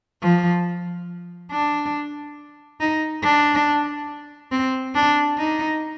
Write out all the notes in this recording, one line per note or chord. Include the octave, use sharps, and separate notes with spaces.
F3
D4
D#4
D4
C4
D4
D#4